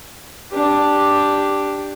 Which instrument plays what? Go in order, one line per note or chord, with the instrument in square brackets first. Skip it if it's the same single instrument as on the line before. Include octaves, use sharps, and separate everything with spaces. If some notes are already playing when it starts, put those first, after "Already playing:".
[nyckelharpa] D4 G4